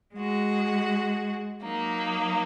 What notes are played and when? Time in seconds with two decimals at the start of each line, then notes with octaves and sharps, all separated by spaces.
0.14 G#3 F#4
1.62 F#3 A#3 D#4